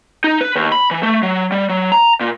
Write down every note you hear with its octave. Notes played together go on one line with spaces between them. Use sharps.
D#4
B4
D#2
B5
E3
A3
F#3
G3
F#3
A#5
A#2